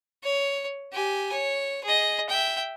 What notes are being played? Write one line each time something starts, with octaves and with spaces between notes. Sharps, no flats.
C#5
G4 G#5
C#5
G#4 D#5
E5 G5